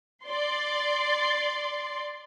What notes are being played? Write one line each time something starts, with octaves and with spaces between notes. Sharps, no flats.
D5 C6